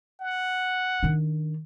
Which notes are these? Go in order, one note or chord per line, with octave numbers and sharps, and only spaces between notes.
F#5
D#3 D4